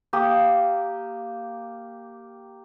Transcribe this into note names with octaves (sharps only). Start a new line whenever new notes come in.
A#3 G4 D#6